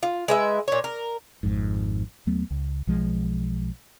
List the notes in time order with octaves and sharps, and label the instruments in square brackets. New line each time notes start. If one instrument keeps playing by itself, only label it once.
[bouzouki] F4
G#3 B4 E5
A#2 C#5
A#4
[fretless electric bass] G#1 F2 G#2
D#2 F#3 A3 B3
C#2
B1 F3 G#3